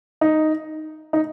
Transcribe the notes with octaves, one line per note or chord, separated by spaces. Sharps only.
D#4
D#4